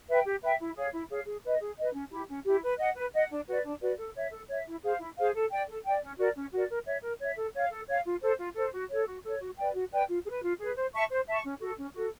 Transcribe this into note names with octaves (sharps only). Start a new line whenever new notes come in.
B4 E5 G5
G4
B4 E5 G5
E4
G#4 C#5 F5
E4
G#4 C#5 F5
G#4
B4 D#5
G#4
B4 D#5
C#4
E4 G4
C#4
E4 G4
B4
D#5 F#5
B4
D#5 F#5
D4
F#4 B4 D5
D4
F#4 B4 D5
A4
C#5 E5
A4
C#5 E5
E4
G#4 C5 F5
E4
G#4 C5 F5
A4
D5 G5
A4
D5 G5
C#4
F#4 A#4 D5
C#4
F#4 A#4 D5
A#4
C#5 E5
A#4
C#5 E5
A4
C#5 F5
A4
C#5 F5
F4
A4 C5
F4
A4 C5
F#4
A4 C#5
F#4
A4 C#5
F#4
B4 D5 G5
F#4
B4 D5 G5
F4
G#4
B4
F4
G#4 B4
C5
E5 A5 C#6
C5
E5 A5 C#6
C#4
F#4 A4
C#4
F#4 A4